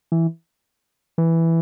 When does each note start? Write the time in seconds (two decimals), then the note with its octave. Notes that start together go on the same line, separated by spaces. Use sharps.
0.12 E3
1.18 E3